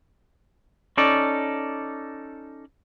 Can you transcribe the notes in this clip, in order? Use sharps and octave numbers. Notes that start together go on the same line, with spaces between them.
C#4 D#4 A4 D5